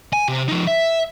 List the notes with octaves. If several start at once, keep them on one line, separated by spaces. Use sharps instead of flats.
G#5
C3
F3 D#4
E5